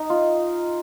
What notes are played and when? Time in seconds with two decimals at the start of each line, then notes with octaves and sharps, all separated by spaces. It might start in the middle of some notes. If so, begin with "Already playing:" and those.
Already playing: D#4
0.10 F4